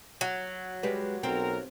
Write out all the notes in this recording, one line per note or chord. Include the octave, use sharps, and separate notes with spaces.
F#3
G3 G#3 B4
B1 C4 A#4